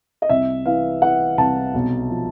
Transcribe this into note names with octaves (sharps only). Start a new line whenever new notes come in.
D#5
C2 E5
E3 F5
E3 F#5
C2 A5
B1
F3